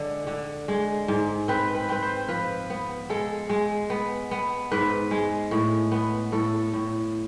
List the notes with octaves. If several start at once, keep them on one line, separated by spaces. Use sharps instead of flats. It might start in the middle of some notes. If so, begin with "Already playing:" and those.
Already playing: D3 G#3 D5
D3
G#3
G#2
C4 B4
B4
C4 B4
C5
F3 B4
B3
G#3 A4
G#3
B3
B3
G#2 B4
G#3
A2
B3
A2 A4
A2